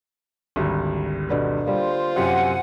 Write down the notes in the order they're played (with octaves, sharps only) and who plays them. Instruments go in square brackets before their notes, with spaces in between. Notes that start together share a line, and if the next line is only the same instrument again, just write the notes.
[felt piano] G#1 D2 G3
[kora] B2 D3 B4
[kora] G3 A#3 [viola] F4 C5
[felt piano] F#2 C3 G4 [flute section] F#5 G#5